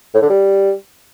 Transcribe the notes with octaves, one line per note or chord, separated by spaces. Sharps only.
A2
D3
G3